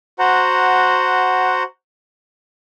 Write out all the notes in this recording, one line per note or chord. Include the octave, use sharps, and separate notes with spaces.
F#4 C5 F#5 A#5